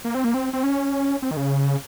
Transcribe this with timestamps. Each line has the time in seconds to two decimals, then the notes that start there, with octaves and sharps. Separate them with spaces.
0.05 A#3
0.15 C4
0.24 A#3
0.34 C4
0.53 C4
0.64 C#4
1.22 C4
1.31 D#3
1.37 C#3